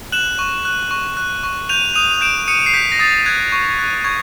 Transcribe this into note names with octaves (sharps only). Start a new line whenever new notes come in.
F#6 E7 F#7
C#6
F#6
C#6
F#6
C#6
G6 D#7 F7
D#6 D#7 F7
G6 D7 E7
D#6 C#7 D#7
C7
G6 B6
A#6
D#6 A6
F#6 G#6
C#6
F#6
C#6 G#6